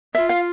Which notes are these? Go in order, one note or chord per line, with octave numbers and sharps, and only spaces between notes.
F4 E5
F5